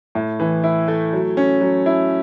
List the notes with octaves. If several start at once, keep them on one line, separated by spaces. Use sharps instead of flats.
A2
E3
E4
A3
F#3
C#4
F#3
E4